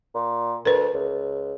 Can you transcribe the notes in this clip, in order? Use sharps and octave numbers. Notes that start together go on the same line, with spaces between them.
A#2
D2 A#4 B4
C#2